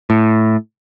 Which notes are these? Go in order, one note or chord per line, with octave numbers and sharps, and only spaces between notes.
A2